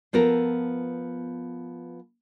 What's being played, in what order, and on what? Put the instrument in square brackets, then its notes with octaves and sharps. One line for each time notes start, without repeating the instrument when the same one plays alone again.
[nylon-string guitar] F3 B3 A4 A#4